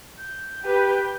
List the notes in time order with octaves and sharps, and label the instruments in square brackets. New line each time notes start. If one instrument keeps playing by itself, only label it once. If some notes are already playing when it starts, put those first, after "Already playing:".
[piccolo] G6
[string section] G4 B4